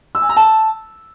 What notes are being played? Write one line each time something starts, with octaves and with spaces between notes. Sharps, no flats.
E6
G#5
A#5
A5